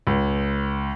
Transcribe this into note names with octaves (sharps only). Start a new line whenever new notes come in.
C#2